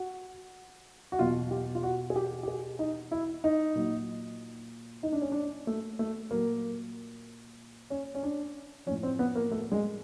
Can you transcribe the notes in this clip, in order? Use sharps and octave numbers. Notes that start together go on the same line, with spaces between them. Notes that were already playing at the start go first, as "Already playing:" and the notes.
Already playing: F#4
F#4
E2 B2 F#3 F4
G4
F4
F#4
G#4
G4
G4
G#4
D#4
E4
D#4
A#2 F#3
D#4
D4
C#4
D4
A3
A3
A#2 F#3 A#3
C#4
C#4
D4
A2 F3 C#4
C4
B3
A#3
A3
G#3